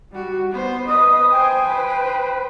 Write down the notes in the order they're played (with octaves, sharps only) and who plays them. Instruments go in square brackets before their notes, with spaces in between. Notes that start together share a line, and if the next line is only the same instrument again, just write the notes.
[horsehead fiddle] G3 F#4
B3 C5
[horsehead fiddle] B4 D#5 [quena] D#6
[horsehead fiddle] C5 G#5 [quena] G5
[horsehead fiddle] B4 C5